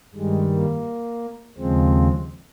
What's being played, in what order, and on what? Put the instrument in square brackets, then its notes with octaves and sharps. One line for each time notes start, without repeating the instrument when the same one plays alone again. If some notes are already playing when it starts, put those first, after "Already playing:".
[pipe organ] G2 D#3 G3 G#3
A#3
D#2 C#3 F3 G#3 C4